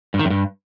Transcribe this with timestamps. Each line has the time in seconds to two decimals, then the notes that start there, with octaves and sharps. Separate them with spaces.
0.14 G2
0.19 D#3
0.25 F#2
0.30 G2